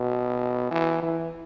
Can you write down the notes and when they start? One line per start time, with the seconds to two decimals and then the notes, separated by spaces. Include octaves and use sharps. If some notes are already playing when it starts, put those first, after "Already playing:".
Already playing: B2
0.71 E3
1.02 E3